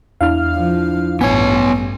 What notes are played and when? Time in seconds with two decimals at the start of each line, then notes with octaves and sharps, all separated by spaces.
0.21 E2 D4 E4 F5 F6
0.55 F3
1.21 A1 G2 B3 C#5 G#5